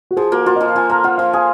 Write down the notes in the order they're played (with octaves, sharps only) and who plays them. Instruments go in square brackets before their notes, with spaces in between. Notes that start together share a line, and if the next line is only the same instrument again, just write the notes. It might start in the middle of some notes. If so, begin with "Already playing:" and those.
[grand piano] F#4
[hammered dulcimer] F3 [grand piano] G#4
[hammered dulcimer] A#3 [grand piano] F#4
[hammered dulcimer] F4 [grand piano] F#4
[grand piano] D#5
[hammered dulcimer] F3
[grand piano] F5
[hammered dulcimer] F3 [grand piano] G#5
[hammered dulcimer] A#3 [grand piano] A#5
[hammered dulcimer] F4 [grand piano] F#5
[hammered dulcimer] F3 [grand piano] F5
[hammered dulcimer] G#4 [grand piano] F5